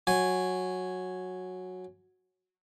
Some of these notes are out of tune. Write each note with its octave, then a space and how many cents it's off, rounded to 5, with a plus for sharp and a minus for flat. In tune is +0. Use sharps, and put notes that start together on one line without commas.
F#3 -10 G#5 +0